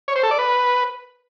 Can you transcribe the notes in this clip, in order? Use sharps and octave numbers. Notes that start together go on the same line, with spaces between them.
C#5
C5
A4
D5
B4